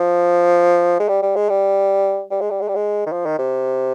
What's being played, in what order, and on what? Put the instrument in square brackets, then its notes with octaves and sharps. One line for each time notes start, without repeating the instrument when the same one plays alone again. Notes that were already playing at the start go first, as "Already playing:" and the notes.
Already playing: [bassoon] F3
G#3
G3
G3
G#3
G3
G3
G#3
G3
G#3
G3
G#3
D#3
F3
D#3
C3